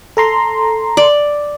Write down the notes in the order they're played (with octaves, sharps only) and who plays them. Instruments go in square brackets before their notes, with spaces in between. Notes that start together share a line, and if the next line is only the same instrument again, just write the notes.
[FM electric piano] A4 A#5 C6
[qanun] D5